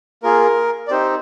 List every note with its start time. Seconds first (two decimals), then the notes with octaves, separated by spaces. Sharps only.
0.23 A#3 F4 G#4 A#4
0.88 D5
0.91 C4 D#4 G4 C5